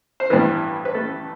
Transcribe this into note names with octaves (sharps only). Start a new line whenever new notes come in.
C5
A1 G2 E3 B3 B4
B4
A3 A4